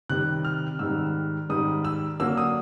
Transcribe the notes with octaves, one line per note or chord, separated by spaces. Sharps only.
C3 D#3 G3 F#6
F6
G#2 D#3 G3 E6
G#2 D#3 G3 D#6
E6
D3 F#3 A#3 E6
D#6